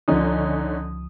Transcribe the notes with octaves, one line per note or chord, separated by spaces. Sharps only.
C#2 D3 F3 C#4 D#4 D#6